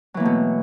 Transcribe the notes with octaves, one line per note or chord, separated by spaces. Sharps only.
B2 E3 F#3 A3 A#3